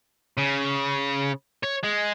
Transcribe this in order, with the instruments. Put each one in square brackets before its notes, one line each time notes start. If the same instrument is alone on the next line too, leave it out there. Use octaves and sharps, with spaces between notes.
[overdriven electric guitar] C#3
C#5
G#3